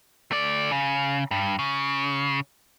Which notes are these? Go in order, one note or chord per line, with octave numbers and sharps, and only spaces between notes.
A3 D5
C#3
G2
C#3